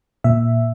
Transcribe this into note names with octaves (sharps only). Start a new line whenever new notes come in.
A#2 E5